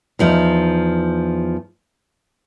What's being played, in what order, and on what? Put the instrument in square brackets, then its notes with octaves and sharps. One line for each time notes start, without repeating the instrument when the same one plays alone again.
[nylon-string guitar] E2 F3 D#4